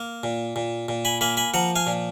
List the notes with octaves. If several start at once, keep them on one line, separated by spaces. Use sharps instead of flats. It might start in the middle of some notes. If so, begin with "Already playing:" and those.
Already playing: A#3
A#2
A#2
A#2
G#5 B5
A#3 G#5 B5
G#5 B5
F3 F#5 A#5
F5 G#5
A#2